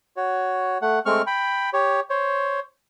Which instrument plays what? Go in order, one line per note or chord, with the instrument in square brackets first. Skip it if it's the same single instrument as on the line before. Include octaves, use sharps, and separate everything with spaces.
[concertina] F#4 C#5
A3 F#5
G#3 A3 C4 C#6 F6
G5 B5
G4 C#5
C5 C#5